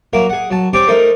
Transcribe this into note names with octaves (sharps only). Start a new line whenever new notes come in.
F#3 A#3 A#4 E5
G#4 F#5
F#3 A5
C4 C#4 G4 D5 D6
A3 D#4 A#4 C5